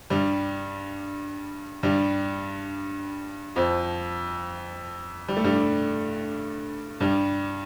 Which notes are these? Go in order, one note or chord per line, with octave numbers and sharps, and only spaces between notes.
G2 G3
G2 G3
F2 F3
G3
A3
G2 G3
G2 G3